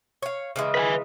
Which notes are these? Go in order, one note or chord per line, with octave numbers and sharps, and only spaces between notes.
C#5 F5
C#3 E3 G#3
B4 G5 G#5